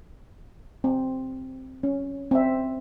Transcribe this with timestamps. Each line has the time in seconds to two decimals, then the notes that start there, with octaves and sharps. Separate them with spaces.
0.84 C4
1.83 C#4
2.31 C4 E5